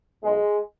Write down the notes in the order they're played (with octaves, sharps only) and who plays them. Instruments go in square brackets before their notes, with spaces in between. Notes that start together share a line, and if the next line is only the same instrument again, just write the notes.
[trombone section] B1 B2 G#3